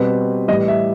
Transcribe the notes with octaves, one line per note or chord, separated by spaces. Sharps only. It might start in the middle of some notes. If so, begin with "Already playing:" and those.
Already playing: B2 G3 C4 B4
A2 E3 G3 D#5
E5